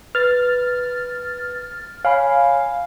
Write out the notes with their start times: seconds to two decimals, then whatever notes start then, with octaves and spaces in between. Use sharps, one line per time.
0.15 B4 F6 A6
2.05 C#5 F5 G#5 B5